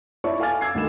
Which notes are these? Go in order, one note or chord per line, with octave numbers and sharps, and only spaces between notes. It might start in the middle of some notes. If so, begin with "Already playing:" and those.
E4 C#5 D5 E5 A5 C#6
A4 F5 G#5 D6 F6 A6
D6 E6 G#6 C7
D2 D3 D#3 G#3 B5 E7